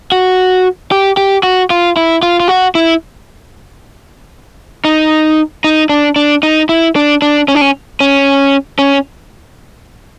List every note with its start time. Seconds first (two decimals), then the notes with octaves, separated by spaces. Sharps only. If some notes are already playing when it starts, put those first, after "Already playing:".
0.12 F#4
0.91 G4
1.17 G4
1.43 F#4
1.70 F4
1.97 E4
2.23 F4
2.40 F4
2.48 F#4
2.75 E4
4.85 D#4
5.64 D#4
5.89 D4
6.16 D4
6.43 D#4
6.69 E4
6.96 D4
7.22 D4
7.48 C#4
7.55 D4
7.61 C#4
8.00 C#4
8.79 C#4